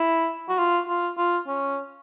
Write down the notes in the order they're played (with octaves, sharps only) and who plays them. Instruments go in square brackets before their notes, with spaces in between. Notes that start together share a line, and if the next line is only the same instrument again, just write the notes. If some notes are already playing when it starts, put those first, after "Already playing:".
Already playing: [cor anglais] E4
F#4
F4
F4
F4
C#4